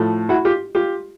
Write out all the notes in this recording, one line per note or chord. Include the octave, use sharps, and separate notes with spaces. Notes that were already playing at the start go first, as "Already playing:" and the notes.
Already playing: A2 F3 A3
E4 F#4
F4 G4
F4 G4